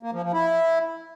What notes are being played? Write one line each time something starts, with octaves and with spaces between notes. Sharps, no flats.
A#3
F3
F3
E4